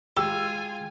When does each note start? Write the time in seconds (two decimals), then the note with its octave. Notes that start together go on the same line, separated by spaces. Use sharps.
0.17 G#3 F4 G4 G5 G#5 E6